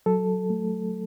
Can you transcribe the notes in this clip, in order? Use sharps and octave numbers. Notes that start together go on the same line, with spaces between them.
F#3 A4
A3